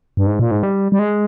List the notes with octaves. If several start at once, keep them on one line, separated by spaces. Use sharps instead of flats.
G2
G#2
A#2
G#2
G3
G3
G#3